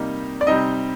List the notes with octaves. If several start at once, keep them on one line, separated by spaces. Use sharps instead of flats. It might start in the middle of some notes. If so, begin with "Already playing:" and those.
Already playing: C3 G3 A#3 D#4
D5
C3 G3 C4 D#4 D#5